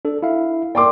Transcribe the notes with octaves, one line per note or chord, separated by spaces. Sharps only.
D4 A4
E4 E5 F5
A#4 D5 G5 C6 D6